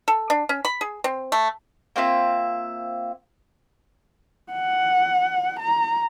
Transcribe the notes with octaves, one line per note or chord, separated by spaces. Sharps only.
A4
D4
C#4
B5
G#4
C4
A3
A#3 C4 F4 E5
F#5
A#5